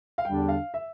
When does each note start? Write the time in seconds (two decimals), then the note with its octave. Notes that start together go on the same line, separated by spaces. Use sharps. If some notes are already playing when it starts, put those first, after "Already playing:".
0.18 F5
0.25 E2 D3 G3 D4 G4 G5
0.48 F5
0.74 E5